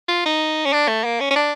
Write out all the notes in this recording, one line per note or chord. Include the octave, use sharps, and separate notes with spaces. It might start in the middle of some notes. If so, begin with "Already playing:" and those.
F4
D#4
C#4
D4
A3
A#3
C#4
C#4
D4